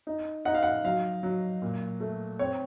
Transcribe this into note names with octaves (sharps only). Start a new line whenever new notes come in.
D#4
D#4 F#5
F5
F#5
F#3 F5
F#3
A#2
A3
C4 C#5